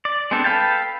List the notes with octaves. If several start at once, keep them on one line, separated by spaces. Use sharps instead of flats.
D5
G#3 B3 C4 D4 A4
A4 B4 F5 G5 A5